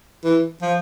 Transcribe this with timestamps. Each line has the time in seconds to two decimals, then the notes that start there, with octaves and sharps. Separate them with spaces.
0.24 E3
0.62 F3